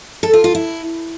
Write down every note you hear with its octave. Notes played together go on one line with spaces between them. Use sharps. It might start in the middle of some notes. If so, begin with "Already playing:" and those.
A4
F4
F4
E4